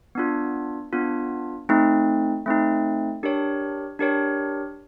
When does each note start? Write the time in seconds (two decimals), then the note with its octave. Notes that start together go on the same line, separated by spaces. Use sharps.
0.15 B3 D4 F4
0.93 B3 D4 F4
1.69 A3 C4 D#4
2.46 A3 C4 D#4
3.23 D4 G4 A#4 C#5
3.99 D4 G4 A#4 C#5